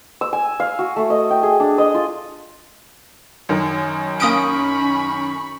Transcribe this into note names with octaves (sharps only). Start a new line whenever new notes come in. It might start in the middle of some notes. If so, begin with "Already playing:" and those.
E6
G#5
F5
F#4
A3
D#5
G5
G#4
D4
D#5
F4
F#2 D#3
A#3 C#4 B5 C#6 D#6 D7